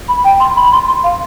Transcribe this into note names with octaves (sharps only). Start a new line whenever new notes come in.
B5
G5
C6
B5
C6
C6
F5